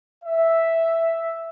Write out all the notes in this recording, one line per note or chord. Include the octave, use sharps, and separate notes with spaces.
E5